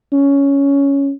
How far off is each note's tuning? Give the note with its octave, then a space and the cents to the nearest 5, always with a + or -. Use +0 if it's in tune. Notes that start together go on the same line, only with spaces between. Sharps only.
C#4 +10